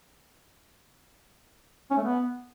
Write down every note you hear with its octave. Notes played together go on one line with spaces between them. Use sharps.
C#4
A3
B3